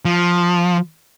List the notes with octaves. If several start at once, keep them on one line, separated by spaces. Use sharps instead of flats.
F3